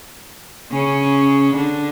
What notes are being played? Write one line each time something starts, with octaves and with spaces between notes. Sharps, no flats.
C#3 C#4
D3 D4